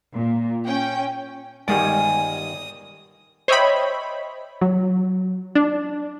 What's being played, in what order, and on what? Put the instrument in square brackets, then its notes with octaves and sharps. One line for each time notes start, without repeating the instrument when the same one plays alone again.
[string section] A#2
C#4 G5
[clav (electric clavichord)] G1 D#3 G3 [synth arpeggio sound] G#3 D5 [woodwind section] G#5 [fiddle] D#6
[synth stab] C5 C#5 D#5 E5 G5 B5
F#3
D4